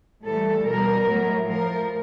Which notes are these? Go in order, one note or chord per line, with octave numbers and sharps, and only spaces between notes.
A2 E3 G3 A4
B2 G3 A#4
A2 F#3
A2 F3 A#4